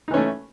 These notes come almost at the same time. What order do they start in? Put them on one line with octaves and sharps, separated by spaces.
D#4 E3 C#4 A3